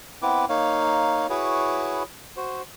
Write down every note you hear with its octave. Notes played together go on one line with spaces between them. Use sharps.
B3 C4 E4 B4 D6
A#3 D#4 C#5 F5
E4 F#4 G#4 B4 C#5
F#4 C5